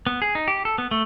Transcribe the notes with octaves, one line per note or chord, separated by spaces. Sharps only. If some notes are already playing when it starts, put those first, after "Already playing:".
B3
G#4
D#4
G4
A4
B3
A3